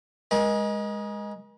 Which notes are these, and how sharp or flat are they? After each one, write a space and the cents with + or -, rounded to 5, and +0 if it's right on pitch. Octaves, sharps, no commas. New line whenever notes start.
G#3 +0 A#4 +40